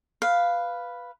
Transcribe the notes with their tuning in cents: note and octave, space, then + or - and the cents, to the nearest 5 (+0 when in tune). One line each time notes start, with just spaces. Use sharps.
B4 +0 F5 +0